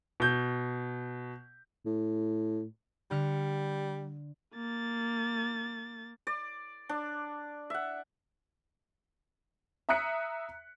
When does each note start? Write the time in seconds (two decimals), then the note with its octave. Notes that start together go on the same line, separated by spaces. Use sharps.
0.20 B2 G6
1.86 A2
3.11 D3 G3 F6 C#7
4.55 A#3 A6
6.27 D5
6.89 D4
7.70 E5 F#5
9.89 E5 A#5 D#6 F#6 B6 C#7